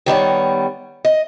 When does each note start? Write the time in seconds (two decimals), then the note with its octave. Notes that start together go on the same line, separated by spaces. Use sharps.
0.06 D#3 G3 B3 C#5
1.05 D#5